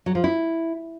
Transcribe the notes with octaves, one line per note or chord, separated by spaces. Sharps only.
F#3
F3
E4